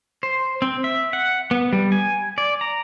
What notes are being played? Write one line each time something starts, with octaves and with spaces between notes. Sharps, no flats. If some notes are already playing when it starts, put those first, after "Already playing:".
C5
C4
E5
F#5
B3
G3
G#5
D5
A#5